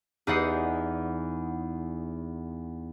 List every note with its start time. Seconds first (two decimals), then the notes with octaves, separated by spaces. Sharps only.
0.27 E2 D#4 D5 F#5 D#6 C7